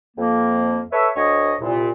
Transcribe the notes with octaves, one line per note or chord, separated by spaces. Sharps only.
F2 A#3
A4 B4 C#5 E5
D2 C#5 D#5
C2 A#2